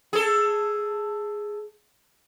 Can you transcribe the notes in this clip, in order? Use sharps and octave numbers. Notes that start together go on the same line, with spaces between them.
G#4 A4